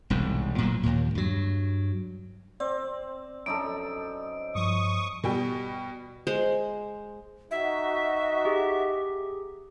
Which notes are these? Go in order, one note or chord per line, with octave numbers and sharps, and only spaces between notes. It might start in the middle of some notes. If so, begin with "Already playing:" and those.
E1 C2 G#2
A#2 F#3 A#3
D#2 A#2
G2 F#3
C4 D5
F#2 D#4 A4 D7
G2 F3 C#6 D#6
B2 G3 G5
G#3 C5
D#4 F#4 E5
G4 G#4